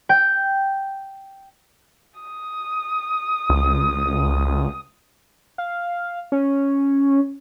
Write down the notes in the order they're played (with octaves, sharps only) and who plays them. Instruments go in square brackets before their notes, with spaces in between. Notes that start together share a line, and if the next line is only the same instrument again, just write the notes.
[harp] G5
[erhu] D#6
[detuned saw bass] C#2
[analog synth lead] F5
C#4